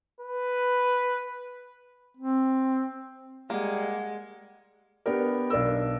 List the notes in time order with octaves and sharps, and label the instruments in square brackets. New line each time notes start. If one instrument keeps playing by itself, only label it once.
[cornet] B4
[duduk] C4
[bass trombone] G3 [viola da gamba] G#3 [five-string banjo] A#3 [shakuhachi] F#5
[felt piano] B3 D4 G4 A#4
B1 D4 A#4 E6